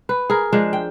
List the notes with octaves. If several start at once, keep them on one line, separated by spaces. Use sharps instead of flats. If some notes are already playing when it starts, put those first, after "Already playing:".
B4
G#4 A#4
F3 G#3 D4
G5